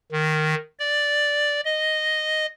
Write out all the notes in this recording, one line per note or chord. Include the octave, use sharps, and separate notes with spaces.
D#3
D5
D#5